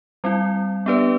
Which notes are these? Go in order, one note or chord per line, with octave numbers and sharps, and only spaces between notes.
G3 C4 E4
B3 D4 G4 B4 D5